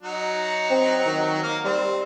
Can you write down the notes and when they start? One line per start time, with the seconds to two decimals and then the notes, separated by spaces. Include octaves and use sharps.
0.03 F#3 D#4 F#4
0.70 C4
1.06 D#3
1.43 A#3 F5
1.65 G3 C4